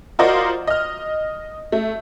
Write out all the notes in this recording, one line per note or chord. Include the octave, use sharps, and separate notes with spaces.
F4 F#4 A#4 C5 D5 D#5
D#5 F6
A3